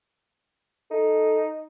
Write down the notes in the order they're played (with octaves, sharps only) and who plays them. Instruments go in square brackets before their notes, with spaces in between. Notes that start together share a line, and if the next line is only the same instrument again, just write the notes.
[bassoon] D#4 [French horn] A4